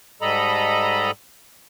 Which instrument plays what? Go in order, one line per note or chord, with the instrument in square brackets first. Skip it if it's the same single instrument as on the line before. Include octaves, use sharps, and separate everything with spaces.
[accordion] G#2 G3 A4 D#5 A#5 B5